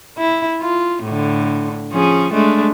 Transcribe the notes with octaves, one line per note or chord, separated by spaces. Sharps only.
E4
F4
A2 D3
F3 C#4 G#4
G#3 A3 D4